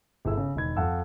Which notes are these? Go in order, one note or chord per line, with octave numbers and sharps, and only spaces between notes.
G1 E4 G#4 E6
C#3
E1 D#3 B5 G#6
F2 F5 F#5 A5 E6